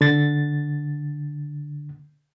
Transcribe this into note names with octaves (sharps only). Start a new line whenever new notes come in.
D3 A6